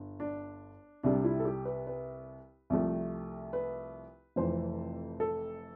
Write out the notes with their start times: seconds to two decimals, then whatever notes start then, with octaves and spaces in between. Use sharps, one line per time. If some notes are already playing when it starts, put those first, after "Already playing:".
Already playing: G1
0.20 D4
1.03 C2 C3 G3 D4
1.24 E4
1.40 A4
1.45 G4
1.65 B4
1.87 B4
2.70 C2 C3 F3 A3
3.53 B4
4.36 F1 F2 E3 C5
5.20 A4